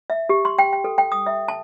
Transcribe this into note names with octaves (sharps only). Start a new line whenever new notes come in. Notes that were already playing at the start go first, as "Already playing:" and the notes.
E5
G4
C6
G5
G5
A4
G5
D#6
E5
A5